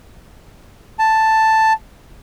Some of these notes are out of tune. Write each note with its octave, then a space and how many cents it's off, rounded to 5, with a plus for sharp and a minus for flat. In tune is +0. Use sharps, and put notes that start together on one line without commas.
A5 +5